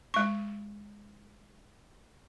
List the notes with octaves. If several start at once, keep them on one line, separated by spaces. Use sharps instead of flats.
G#3 C#6